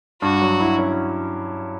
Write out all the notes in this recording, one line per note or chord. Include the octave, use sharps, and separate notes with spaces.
G2 F#4
F#3
E4
C#4